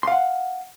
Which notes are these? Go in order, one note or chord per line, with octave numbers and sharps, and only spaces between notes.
F5 F#5 C6